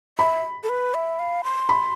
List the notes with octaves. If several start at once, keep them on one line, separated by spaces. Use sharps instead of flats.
E5 B5
A4
B4
E5
F5
C6
B5